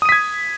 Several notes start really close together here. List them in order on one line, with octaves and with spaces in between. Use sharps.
D#6 D#7 B6 G#6